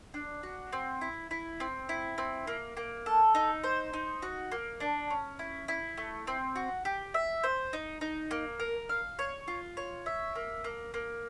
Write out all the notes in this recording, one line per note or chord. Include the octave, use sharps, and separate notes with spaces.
D4
F#4
C4
E4
E4
C4
E4
C4
A#3
A#3
A4
D#4
C5
D#4
F#4
A#3
D4
C#4
E4
E4
A3
C4
F#4
G4
E5
C5
D#4
D#4
A#3
A#4
F5
C#5
F4
C#5
E5
A#3
A#3
A#3